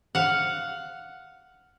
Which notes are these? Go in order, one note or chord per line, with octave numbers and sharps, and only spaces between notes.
F5 F#5